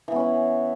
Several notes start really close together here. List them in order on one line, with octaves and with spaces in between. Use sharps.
E3 B3 C#4 E4